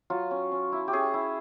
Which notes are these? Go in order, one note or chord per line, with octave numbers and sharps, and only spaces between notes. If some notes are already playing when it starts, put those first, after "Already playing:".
F#3 F4
C#4
C#4
E4
G4
C#4 G#4
E4